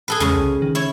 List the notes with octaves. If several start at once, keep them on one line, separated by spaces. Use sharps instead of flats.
G#4 A4 B4
E2 C#3 G#3 C#4
C2
D#3
E4 C#5